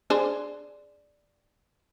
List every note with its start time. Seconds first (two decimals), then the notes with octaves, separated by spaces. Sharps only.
0.10 D4 G#4 C5